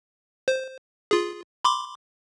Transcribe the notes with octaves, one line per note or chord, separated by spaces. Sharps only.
C5
F4 G#4
B5 C6 D6